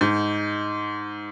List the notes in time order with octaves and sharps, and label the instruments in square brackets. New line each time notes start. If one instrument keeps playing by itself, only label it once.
[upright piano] G#2